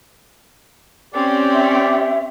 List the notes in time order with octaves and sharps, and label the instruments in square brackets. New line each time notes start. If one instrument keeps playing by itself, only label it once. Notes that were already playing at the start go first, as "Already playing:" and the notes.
[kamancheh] C4 C#4 [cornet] G4 [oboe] D5
[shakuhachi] E5